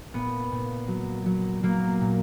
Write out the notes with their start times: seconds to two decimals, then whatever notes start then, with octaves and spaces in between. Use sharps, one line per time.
0.14 A#2 B3
0.52 A#2
0.88 F#3
1.26 F#3
1.63 F#3 A#3
2.01 A#2